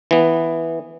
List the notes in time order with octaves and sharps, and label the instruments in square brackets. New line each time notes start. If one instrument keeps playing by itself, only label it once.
[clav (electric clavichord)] E3 B3